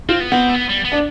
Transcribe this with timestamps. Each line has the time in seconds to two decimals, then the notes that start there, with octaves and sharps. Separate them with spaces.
0.09 C4 F4
0.20 B3
0.32 B3 C4
0.49 A3
0.54 B3
0.69 G3
0.85 B3
0.92 D4